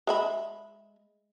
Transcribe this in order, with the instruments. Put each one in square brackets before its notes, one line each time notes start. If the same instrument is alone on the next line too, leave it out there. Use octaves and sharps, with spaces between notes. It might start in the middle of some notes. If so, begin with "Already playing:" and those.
[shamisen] G#3 E5 B5